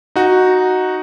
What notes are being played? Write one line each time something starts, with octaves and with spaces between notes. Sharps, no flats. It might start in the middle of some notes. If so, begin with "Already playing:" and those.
D#4 F#4